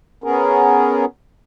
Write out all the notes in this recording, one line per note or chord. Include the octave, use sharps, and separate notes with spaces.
B3 C#4 G#4 A#4